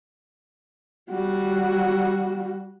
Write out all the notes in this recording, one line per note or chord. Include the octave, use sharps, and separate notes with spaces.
G3 F#4